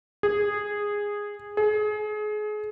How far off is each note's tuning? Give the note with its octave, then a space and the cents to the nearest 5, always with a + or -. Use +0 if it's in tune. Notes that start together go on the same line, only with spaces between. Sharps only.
G#4 -10
G#4 +30